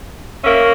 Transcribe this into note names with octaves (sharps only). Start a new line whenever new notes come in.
A#3 C#4 E5